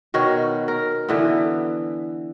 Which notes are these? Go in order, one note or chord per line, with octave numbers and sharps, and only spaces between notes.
B2 D#3 F#4 C#5
A#4
D3 E3 B3